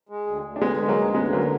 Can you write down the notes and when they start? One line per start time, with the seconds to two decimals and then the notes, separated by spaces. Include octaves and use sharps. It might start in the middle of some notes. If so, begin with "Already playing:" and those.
0.09 G#3
0.27 D2
0.44 D2
0.56 D4
0.62 D3 G#3 B3
0.80 G#3
0.88 F#3 A#3
0.97 D2
1.15 D2 G#3 B3
1.32 D3 F#3 A#3